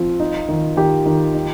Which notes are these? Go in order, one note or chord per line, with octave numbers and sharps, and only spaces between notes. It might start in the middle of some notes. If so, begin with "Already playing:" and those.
Already playing: F3 C4 F4
D#4
D#3
D#3 G4
D#3
D#4